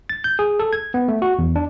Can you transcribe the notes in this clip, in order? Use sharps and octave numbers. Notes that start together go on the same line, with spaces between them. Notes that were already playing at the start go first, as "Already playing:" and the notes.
A6
G6
G#4
A4
G#6
B3
A3
F#4
E2
D4